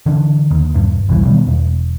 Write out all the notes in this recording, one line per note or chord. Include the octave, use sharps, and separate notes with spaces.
D3 E3 D4
D#2
E1 G2
B1 E2 E3 G3
B2 D#3 G3 B3
E1